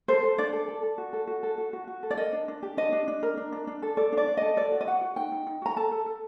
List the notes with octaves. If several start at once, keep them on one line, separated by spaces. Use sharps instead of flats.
A4 C5
A4
D4 D5
A4
A4
A4
F#4
A4
F#4
A4
F#4
F#4
F#4
A4
D5
A#4 D#5
D4
D4
G4
D4 D#5
D4
D4
A#4
D4
D4
D4
A4
A4 D5
D4
D5
D4
A4 D#5
A4 D5
F#4
D#5
F#4 F#5
F#4
D#4 G5
D#4
D#4
F#4 A#5
A4 A5
A4
A4